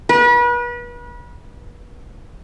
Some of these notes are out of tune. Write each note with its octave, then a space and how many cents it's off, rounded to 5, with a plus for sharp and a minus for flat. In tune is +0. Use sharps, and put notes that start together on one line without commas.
B4 -35